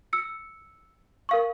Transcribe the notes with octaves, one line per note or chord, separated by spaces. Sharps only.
E6 C#7
A#4 F5 C#6